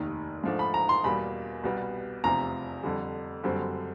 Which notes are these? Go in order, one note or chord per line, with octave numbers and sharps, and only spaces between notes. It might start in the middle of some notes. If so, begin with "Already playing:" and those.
Already playing: F1 D#2 D#3
G#2 F3 A3 D4
B5
A#5
C6
E2 B2 G3 A#3 B5
C2 B2 G3 B3
F1 E2 C3 F3 A#5
F2 D3 G3
F#1 F#2 D3 G3 C4